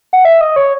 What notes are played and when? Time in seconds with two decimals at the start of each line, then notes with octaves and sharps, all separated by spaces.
0.13 F#5
0.25 E5
0.41 D#5
0.56 C#5